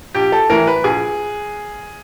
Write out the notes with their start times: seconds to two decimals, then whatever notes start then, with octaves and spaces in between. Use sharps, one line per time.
0.15 A#1 G4
0.32 A4
0.50 A2 E3 A#4
0.67 B4
0.84 A#1 G#4